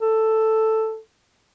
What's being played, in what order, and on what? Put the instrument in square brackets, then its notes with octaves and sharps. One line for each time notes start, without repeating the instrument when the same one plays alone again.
[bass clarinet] A4